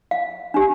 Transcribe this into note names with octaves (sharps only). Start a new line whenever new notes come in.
F5
D4 G4